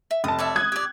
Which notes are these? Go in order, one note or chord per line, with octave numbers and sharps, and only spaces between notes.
E5
F1 A5 D#6
C#5 D5 E5
D#6 F#6 G#6
G4 D5